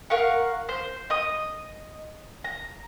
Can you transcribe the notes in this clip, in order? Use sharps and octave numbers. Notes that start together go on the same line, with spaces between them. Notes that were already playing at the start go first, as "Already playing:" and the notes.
A#4 F5 F#5 C#6
C5
D#5 D#6
A#5